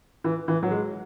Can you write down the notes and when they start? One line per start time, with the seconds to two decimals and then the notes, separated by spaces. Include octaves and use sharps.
0.24 E3
0.48 E3
0.63 F#3
0.71 G#3